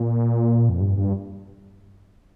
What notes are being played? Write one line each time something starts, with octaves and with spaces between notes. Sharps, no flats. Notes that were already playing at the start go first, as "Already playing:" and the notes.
Already playing: A#2
F2
G2
G2